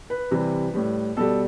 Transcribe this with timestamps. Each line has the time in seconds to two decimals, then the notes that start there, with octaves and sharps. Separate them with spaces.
0.10 B4
0.31 C3 E3 G3
0.74 A2 G3
1.16 B2 G3 A4